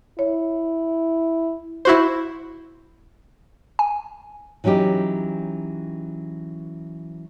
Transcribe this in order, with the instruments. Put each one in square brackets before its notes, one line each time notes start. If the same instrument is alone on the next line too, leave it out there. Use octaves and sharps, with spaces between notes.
[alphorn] E4 [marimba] C#5
[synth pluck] E4 F#4 C5
G#5
[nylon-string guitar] E3 F#3 C#4 D#4 G4